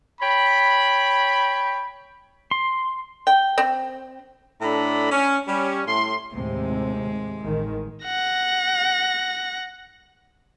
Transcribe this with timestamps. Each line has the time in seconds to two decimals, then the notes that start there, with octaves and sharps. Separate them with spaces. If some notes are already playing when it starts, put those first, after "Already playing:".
0.21 C#5 G5 B5
2.51 C6
3.27 G5
3.58 C4
4.61 A2 D4 A4 A#5 B5
5.10 C#4
5.47 G3 C#4
5.86 A2 C6
6.34 D#2 A2 C3 G#3
7.42 A1 D#3
8.05 F#5 A#6